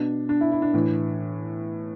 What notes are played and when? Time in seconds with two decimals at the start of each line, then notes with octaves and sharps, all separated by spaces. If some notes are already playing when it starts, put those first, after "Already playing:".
Already playing: B2 D4
0.29 D4
0.41 E4
0.52 E4
0.62 D4
0.74 A2 E3